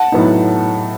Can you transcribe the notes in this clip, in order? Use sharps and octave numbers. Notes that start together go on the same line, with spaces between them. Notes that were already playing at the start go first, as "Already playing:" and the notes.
Already playing: F#5 A5
A2 F#3 B3 D#4